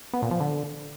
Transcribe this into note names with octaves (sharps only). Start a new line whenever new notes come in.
B3
A#2
F3
D3